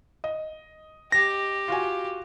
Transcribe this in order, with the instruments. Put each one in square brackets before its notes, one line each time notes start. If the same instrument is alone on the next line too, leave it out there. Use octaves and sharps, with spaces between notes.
[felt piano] D#5
[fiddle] G4 [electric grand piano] A#6
[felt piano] F4 F#4 G#5